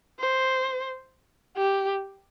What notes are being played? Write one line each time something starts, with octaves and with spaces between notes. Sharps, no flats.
C5
G4